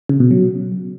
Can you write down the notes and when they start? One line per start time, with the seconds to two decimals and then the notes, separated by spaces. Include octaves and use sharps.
0.09 C#3
0.20 B2
0.31 F#3